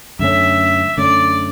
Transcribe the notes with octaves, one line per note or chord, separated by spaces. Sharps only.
F#2 D3 A3 C#4 E5
F#2 D3 A3 C#4 D5